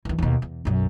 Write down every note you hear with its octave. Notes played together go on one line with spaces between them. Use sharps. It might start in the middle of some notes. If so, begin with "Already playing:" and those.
D#2 E3
D#2 B2
E2
B1 F#2